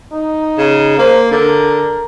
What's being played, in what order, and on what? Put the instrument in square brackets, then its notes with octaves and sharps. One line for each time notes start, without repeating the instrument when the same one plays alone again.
[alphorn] D#4
[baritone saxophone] C#3
[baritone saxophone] A#3 [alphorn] C5
[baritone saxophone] D3 [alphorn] A#4